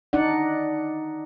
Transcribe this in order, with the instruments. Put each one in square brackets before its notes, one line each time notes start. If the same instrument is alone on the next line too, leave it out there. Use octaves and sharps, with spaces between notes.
[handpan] D4 D#4 D5 F#5